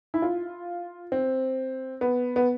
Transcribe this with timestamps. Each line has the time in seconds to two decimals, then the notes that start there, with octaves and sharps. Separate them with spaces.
0.14 E4
0.22 F4
1.12 C4
2.01 B3
2.36 B3